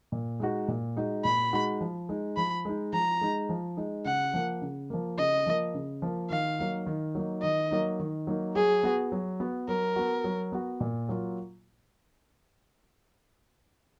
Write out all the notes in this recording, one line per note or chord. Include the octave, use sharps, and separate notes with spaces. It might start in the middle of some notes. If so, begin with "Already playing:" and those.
A#2
G#3 D#4 F#4
A#2
G#3 D#4 F#4
A#2 B5
G#3 D#4 F#4
F3
G#3 D#4
F3 B5
G#3 D#4
F3 A#5
G#3 D#4
F3
G#3 D#4
C#3 F#5
F3 A#3
C#3
F3 A#3
C#3 D#5
F3 A#3
C#3
F3 A#3
D#3 F5
F#3 A#3 D#4
D#3
F#3 A#3 D#4
D#3 D#5
F#3 A#3 D#4
D#3
F#3 A#3 D#4
F#3 G#4
B3 F#4
F#3
B3 F#4
F#3 A#4
B3 F#4
F#3
B3 F#4
A#2
F#3 A#3 F4